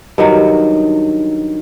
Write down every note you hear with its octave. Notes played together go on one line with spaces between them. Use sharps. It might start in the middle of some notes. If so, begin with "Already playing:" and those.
G2 D#3 F#3